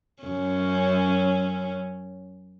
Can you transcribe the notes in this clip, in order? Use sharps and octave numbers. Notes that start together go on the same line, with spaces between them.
F#2 C#4